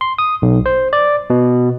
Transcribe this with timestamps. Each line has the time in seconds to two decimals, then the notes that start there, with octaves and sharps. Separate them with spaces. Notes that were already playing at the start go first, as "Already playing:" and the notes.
0.01 C6
0.19 D#6
0.42 B1
0.66 C5
0.93 D5
1.30 B2